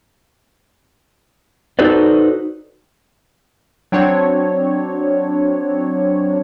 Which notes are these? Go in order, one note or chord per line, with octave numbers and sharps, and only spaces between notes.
D#4 F#4 A4 B4 C5 D5
F#3 C4 D4 C#5